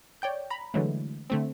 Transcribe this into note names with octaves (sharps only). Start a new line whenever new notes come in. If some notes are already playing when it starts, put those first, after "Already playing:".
C#5 D5 G5 G6
A#5 B5
D3 E3 F#3 G#3 A3
D3 A3 C4